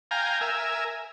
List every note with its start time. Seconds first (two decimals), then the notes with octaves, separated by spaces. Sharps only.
0.11 F5 G5 G#5 A#5
0.41 A#4 E5 G#5